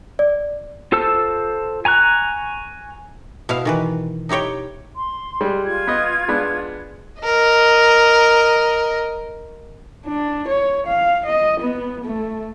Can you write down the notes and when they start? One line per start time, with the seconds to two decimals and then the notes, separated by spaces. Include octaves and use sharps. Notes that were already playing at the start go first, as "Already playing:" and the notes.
0.19 D5
0.92 F4 A4 C5 A5 E6
1.85 G#5 A#5 C#6 F#6
3.49 B2 E4 F5
3.65 D#3 E3 B4
4.29 D#4 E4 G4 C#5 G5
4.95 C6
5.41 G3 G#3
5.64 F4 G#6
5.87 B3 D#5
6.28 G#3 B3 D4
7.22 A#4 D#5
10.06 D4
10.48 C#5
10.87 F5
11.26 D#5
11.60 B3
12.04 A3